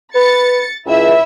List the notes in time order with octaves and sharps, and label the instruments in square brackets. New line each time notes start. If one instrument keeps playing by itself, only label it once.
[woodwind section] B4 [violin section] A6 C#7
[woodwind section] C#2 [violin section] E4 E5